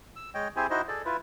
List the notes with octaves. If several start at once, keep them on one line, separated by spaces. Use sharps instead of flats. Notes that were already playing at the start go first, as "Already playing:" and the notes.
E6
G#3 C#5 D#5 G5
C4 E4 G4 G#4 C5 G#5
D#4 E4 F#4 C5 D#5
G#4 A4 D5
E4 F4 B4